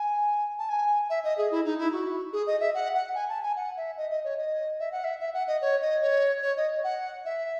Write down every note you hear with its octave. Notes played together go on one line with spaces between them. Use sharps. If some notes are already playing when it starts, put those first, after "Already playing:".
Already playing: G#5
A5
G#5
E5
D#5
G#4
E4
D#4
E4
F#4
G#4
D#5
E5
F#5
F#5
G#5
A5
G#5
F#5
E5
D#5
D#5
C#5
D#5
E5
F#5
E5
E5
F#5
D#5
C#5
D#5
C#5
C#5
D#5
F#5
E5